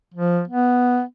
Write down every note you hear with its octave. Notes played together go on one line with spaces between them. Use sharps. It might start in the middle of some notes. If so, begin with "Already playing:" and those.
F3
B3